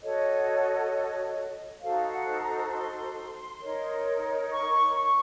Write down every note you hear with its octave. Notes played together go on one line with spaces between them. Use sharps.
F#4 A4 C#5 D#5
D#4 F#4 A4 C5 F5
F#5
A#5
C6
D#4 A#4 C#5
C#6
C#6